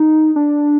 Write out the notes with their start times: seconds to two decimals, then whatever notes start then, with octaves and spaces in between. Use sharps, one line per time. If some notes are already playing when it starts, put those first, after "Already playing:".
Already playing: D#4
0.36 D4